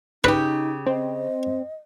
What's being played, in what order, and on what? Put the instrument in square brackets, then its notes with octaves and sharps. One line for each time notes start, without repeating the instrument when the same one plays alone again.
[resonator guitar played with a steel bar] C#3 G4 [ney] D#4 [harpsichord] B4
[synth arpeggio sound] C4 [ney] D#5